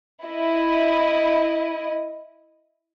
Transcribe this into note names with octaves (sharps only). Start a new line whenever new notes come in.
E4 D#5